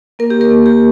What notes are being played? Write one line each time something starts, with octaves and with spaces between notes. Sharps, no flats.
A#3 A#4
G4
A#4
A#3
G4